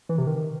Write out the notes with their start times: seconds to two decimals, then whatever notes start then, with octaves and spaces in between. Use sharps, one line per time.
0.09 E3
0.18 C3
0.27 D#3